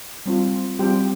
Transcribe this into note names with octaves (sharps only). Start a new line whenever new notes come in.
G3 C4 F4
G3 C4 F4 G4 G5